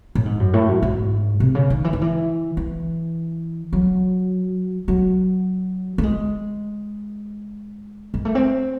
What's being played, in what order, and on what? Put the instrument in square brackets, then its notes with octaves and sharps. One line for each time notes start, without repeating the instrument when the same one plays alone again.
[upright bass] A2
G#2
F#2
A2
F#2
G#2
C3
C#3
D#3
E3
D#3
E3
E3
F#3
F#3
A3
G#3
G#3
A3
C4